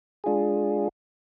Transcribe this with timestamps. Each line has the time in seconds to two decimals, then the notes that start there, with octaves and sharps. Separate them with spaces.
0.24 G#3 D4 F4 G#4